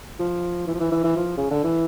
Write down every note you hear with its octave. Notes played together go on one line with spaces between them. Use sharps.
F3
E3
F3
E3
E3
E3
F3
C#3
D3
E3